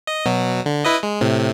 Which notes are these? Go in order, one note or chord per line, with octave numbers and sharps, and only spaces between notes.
D#5
B2 F#3
D3
E4 B4 D#5
G#3
A2 C3